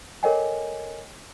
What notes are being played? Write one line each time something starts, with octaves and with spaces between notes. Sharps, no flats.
A4 A#4 C#5 D#5 G5 G#5